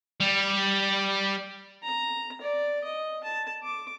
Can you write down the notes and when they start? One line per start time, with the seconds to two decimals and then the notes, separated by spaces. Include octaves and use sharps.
0.20 G3
1.83 A#5
2.41 D5
2.84 D#5
3.24 A5
3.63 D6